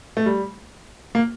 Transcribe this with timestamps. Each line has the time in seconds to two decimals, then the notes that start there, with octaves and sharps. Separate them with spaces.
0.17 A3
0.26 G3
1.15 A#3